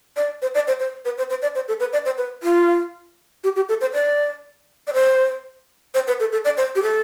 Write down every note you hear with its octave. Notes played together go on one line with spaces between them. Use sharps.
D5
C5
D5
C5
C5
B4
C5
C5
D5
C5
A4
B4
D5
C5
B4
F4
G4
G4
A4
C5
D5
D5
C5
C5
B4
A4
A4
D5
C5
G4
A4